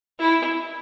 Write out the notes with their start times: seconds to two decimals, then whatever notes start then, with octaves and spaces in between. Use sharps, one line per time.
0.19 E4